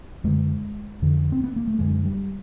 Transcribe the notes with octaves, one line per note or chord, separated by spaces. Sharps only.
F#2 D3 G#3
F2 D3
C4
B3
A#3
A3
F#2 D3 G#3
G3